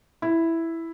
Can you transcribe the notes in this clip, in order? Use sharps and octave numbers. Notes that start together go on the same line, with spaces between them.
E4